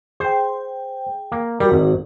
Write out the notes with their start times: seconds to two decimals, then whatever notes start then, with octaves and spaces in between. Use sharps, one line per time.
0.20 G#4 C5 G5
1.32 A#3
1.60 G3 F#4 A#4
1.72 G#1